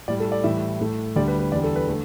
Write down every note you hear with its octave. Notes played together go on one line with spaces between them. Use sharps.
A2 G3 D5
A4
D5
A2 E3 G3 E5
A2 A3
D2 D3 G3 D5
B4
B4
E2 D3 G3 D5
A4
B4
D3 A3